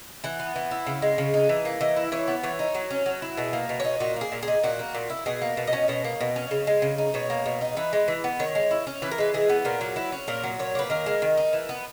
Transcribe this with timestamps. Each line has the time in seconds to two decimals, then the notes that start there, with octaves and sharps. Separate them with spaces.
0.24 E3 F#5
0.40 B3
0.56 E3
0.71 E4
0.86 C#3
1.02 G#3
1.18 C#3
1.34 D#4
1.49 E3
1.65 A#3
1.81 E3 D#5
1.96 E4
2.12 E3 C#5
2.28 B3
2.43 E3 C#5
2.59 D#4
2.75 F#3
2.91 C#4
3.06 F#3
3.22 E4
3.37 B2 G#4
3.53 A#3
3.69 B2
3.80 C#5
3.85 D#4
4.00 A#2 F#4
4.16 A#3 G#4
4.32 A#2
4.43 G#4
4.48 D#4
4.63 A#2 F#4
4.79 A#3
4.95 A#2
5.10 E4
5.26 B2 G#4
5.42 A#3
5.57 B2
5.67 D#5
5.73 C#4
5.88 B2 D#5
6.04 A#3
6.21 B2
6.36 C#4
6.51 C#3
6.67 G#3
6.82 C#3
6.98 D#4
7.14 B2 C#5
7.30 A#3
7.46 B2
7.61 D#4
7.77 E3 B4
7.93 G#3
8.08 E3
8.24 B3
8.39 D#3 C#5
8.55 G#3
8.71 E4
8.87 C#4
9.02 E3 B4
9.11 A#4
9.18 G#3 B4
9.34 E3 G#4
9.49 B3
9.65 A#2 A#4
9.81 F#3
9.96 E4 B4
10.12 C#4
10.28 A#2 A#4
10.43 F#3
10.59 A#2 C#5
10.75 A#3 B4
10.90 D#3 A#4
11.06 G#3
11.22 D#3
11.37 D#4
11.53 E3
11.69 B3